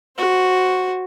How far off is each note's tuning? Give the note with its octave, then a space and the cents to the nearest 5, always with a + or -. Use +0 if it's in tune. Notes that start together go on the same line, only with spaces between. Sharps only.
F#4 +0 C5 +10